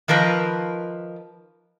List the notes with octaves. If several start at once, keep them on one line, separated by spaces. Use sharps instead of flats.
D#3 F3 A#4 B4